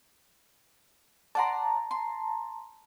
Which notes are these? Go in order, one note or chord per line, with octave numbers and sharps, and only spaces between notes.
D5 F#5 A5 A#5 C6
C6